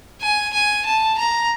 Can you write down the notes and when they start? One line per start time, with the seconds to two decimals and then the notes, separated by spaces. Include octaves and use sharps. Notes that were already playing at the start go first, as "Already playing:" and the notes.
0.21 G#5
0.53 G#5
0.86 A5
1.18 A#5